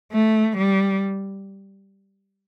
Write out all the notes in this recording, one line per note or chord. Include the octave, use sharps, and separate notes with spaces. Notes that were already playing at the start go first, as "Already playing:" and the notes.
A3
G3